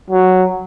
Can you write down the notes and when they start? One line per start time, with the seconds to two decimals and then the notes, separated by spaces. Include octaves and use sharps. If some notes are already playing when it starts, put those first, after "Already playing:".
0.10 F#3